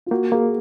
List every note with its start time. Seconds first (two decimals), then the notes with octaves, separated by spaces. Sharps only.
0.06 F4
0.11 A#3 F#4
0.32 A#3 G#4